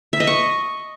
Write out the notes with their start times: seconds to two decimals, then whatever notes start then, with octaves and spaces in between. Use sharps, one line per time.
0.13 E5
0.20 D#5
0.27 C#6